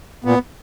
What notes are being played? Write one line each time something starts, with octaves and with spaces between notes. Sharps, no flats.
A#2 B3